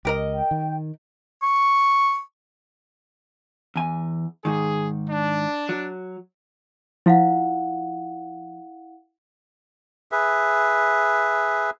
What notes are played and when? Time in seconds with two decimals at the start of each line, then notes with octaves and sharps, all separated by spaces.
0.05 C#2 G4 A#4 D#5
0.34 G5
0.51 D#3
1.43 C#6
3.76 E2 G#5
4.45 G#2 D#3 G#4
5.10 D4
5.69 F#3
7.06 F3 E4 F5 F#5
10.12 G#4 B4 E5